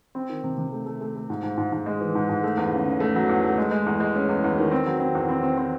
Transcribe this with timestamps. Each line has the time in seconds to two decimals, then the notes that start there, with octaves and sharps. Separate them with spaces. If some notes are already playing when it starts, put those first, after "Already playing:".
0.15 C4
0.29 D#3
0.44 C3
0.58 C3
0.72 A3
0.86 A3
1.01 A3
1.15 A3
1.30 G#2
1.43 G#2
1.58 G#2
1.72 G#2
1.86 G#3
2.00 E3
2.15 G#2
2.29 G#2
2.43 A3
2.57 E2
2.72 C#3
2.86 C#3
3.00 A3
3.15 F#3
3.29 E2
3.44 A3
3.58 G#3
3.71 G#3
3.86 E2
4.00 G#3
4.15 C#4
4.29 E2
4.44 E2
4.58 D#3
4.71 C4
4.86 F#3
5.00 C4
5.15 E2
5.29 C4
5.43 C4
5.58 C4